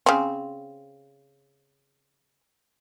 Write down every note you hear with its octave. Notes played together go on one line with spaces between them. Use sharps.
C#3 C4